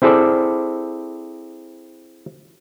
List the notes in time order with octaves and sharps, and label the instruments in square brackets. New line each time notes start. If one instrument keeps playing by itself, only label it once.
[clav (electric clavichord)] C4 E4 G#4 A4 C5 D5